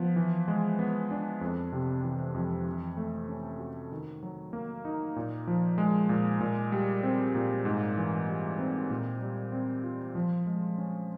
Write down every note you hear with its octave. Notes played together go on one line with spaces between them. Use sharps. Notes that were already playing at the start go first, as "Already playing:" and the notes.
Already playing: F3 B3
E3
G#3
B3
D4
F2
C3
E3
F2
E3
A3
C#4
F#4
D#3
F#3
A#3
D#4
A#2
F3
G#3
A#2
A#2
G3
C4
A#2
G#2
E3
G3
C4
A#2
G3
C4
F4
F3
G#3
C#4